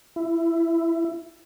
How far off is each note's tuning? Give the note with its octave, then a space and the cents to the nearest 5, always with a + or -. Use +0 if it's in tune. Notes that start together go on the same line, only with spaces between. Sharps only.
E4 +15